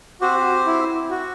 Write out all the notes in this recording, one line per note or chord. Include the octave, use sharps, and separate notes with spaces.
C4 F#4 G4 C5
E4
F#4